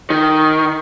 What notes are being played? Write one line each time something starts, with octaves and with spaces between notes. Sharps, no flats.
D#3